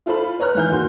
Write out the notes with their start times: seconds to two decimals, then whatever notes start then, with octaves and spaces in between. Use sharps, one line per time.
0.06 E4 F4 A4 C5 B5
0.39 B4 C#5 A#5 F6 F#6
0.55 G#2 E3 G6
0.71 D#2 A#2 F#4 C6